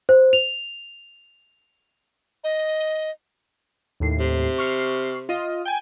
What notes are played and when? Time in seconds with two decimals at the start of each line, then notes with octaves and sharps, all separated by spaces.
0.09 C5
0.33 F7
2.44 D#5
4.00 D#2 A2 C7
4.20 C3
4.58 C#6 F6 C7
5.29 F4 D#5
5.65 G5 G#5